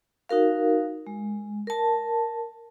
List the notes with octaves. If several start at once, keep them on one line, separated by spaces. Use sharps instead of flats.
D#4 F#4 A#4 F5
G#3
A#4 A5